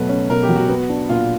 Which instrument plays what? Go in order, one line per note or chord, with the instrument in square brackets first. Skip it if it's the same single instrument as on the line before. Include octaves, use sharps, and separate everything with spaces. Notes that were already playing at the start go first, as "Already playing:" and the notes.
Already playing: [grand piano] B2 F#3 A3 [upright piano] B4
[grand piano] C#4
[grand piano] B2 [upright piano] A#4
[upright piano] G4
[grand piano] F#3
[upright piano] F#4
[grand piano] B3
D4
[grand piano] A#2 [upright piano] F4